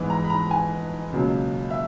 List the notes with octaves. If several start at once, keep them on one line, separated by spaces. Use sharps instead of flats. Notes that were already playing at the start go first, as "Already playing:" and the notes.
Already playing: G#2 E3 G#3 B3
A#5
B5
A#5
G#5
C#2 B2 F#3 A#3
E5